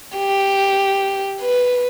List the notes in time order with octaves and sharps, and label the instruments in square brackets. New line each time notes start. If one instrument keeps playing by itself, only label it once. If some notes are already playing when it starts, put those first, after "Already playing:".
[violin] G4
B4